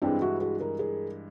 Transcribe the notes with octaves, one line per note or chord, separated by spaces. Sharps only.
G2 E3 G#3 C4 D4
E4 F#4
F#4 G#4
G#4 A#4
G#4 A#4